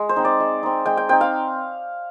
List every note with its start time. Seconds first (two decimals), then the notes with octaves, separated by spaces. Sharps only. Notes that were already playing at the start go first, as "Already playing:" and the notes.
Already playing: G#3
0.09 C5
0.16 C4 D#4
0.25 D5
0.40 G#3
0.63 C4 D#4
0.86 G#3 G5
0.97 G5
1.09 C4 D#4 G5
1.21 F5